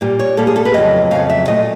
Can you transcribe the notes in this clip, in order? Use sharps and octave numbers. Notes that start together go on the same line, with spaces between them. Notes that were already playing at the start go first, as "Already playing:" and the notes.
A#2 G3 A#3
C#5
A#2 G3 A#3 A4
G#4
A4
B4
F2 C#3 F#3 D#5
F2 C#3 F#3 F5
E5
A#2 F#3 A3 D#5